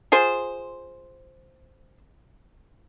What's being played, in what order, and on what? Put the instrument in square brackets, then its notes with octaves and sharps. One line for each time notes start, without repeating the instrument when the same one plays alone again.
[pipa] F4 G#4 C5